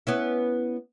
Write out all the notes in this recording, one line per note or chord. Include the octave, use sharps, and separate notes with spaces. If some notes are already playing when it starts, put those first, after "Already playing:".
B3 C#4 E4